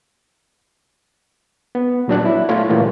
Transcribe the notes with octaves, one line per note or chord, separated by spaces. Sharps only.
B3
A#2 F#3 D4 F#6
E4
A3 F4 C#5
A#2 E3 G3 A3 A#3 C#4